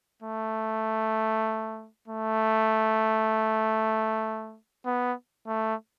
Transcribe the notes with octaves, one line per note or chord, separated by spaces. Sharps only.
A3
A3
B3
A3